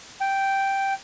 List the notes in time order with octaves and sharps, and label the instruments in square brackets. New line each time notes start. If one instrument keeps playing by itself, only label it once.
[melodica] G5